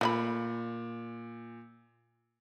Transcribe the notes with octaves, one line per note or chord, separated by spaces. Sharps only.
A#2 A3 D#5 B5